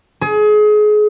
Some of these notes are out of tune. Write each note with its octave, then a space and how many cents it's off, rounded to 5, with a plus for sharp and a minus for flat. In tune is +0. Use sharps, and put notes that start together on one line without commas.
G#4 +30